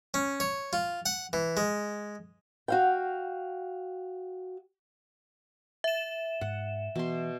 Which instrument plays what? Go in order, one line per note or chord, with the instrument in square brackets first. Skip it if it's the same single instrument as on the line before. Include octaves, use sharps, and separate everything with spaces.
[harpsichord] C#4
C#5
F4
F#5
E3
G#3
[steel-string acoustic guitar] F#4 F5 G5
[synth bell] E5 E7
[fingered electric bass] G#2 [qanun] F#5
[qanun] B2 C6 [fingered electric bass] E3